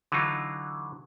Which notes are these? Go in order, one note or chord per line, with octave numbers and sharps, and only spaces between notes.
D3 E3 F#3 D#4 F4